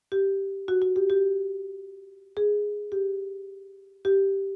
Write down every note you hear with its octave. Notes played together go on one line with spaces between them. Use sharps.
G4
F#4
F#4
G4
G4
G#4
G4
G4